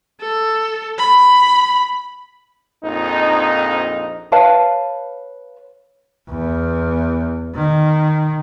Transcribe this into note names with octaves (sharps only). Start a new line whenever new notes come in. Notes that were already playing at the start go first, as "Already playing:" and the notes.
A4
B5
A#1 F2 D#4
B4 C#5 F5 A5
E2
D#3